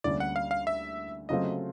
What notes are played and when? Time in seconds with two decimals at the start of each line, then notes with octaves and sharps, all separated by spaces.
0.04 D2 D3 G3 A#3 C#4 D5
0.20 F#5
0.36 F5
0.51 F5
0.67 E5
1.29 C#3 F#3 A3 C4 F4 D#5